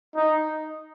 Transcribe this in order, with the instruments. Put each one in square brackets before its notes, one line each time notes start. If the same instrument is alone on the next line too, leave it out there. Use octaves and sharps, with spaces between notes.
[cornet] D#4